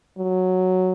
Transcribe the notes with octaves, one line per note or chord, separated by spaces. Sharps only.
F#3